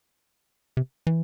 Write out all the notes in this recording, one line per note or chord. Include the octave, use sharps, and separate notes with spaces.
C3
E3